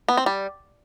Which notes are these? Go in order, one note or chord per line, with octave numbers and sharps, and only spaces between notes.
B3
C4
G3